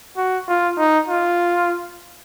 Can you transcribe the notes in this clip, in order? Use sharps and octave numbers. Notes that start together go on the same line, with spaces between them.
F#4
F4
D#4
F4